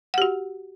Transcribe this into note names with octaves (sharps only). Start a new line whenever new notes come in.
F#4 G4 F#5